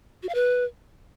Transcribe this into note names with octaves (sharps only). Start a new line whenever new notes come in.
F#4
F5
B4